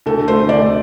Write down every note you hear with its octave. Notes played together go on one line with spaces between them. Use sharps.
D2 A4
D3 A3 C5
D2 D5